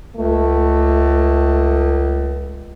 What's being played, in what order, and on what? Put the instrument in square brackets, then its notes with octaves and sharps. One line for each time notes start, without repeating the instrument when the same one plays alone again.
[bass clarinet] C#2 [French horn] A3